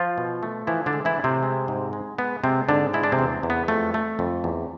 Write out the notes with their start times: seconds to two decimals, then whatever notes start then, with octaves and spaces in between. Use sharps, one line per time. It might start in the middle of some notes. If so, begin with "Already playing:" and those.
Already playing: F3 F4
0.18 B2
0.43 A3
0.67 E3 F3 E4
0.86 D3 D4
0.93 G#3
1.05 E3 E4
1.18 A2
1.24 C3 C4
1.43 G#3
1.68 G#2
1.93 G#3
2.18 G#3 B3
2.44 C3 G#3 C4
2.69 G#2 D3 D4
2.94 G#3 E4
3.03 D4
3.12 C3 C4
3.19 E2
3.43 E2
3.50 B3
3.68 F2 A3
3.94 A3
4.19 F2
4.44 E2